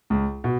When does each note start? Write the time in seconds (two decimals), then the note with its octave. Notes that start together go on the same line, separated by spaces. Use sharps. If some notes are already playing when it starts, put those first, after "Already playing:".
0.10 C#2
0.44 B2